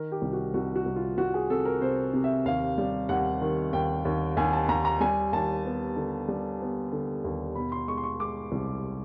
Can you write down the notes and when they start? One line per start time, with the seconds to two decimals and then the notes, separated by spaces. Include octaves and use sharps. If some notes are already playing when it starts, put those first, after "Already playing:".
Already playing: D#3 A#4
0.12 G4
0.22 C2
0.33 F#4
0.54 C2 F#4
0.76 F#4
0.86 C2
0.96 F4
1.18 C2 F#4
1.34 G#4
1.50 C3 A4
1.65 A#4
1.81 C3 C5
2.13 C3
2.24 E5
2.45 D#2 F5
2.78 G3
3.09 D#2 F#5
3.41 D#3
3.73 D#2 G5
4.05 D#2
4.37 D#2 G#5
4.53 A5
4.69 D#2 A#5
4.85 A#5
5.01 G3 G#5
5.33 D#2 A5
5.65 B3
5.96 D3
6.28 G3
6.61 B3
6.92 D3
7.24 D#2
7.55 B2 B5
7.72 C6
7.88 G#3 C#6
7.97 C6
8.04 C#6
8.20 G#3 D6
8.52 C2